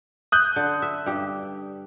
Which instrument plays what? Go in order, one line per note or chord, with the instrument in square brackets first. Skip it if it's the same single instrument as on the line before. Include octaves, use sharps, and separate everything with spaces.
[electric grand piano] D#6 F#6 G6
[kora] D3
E5
G2 G4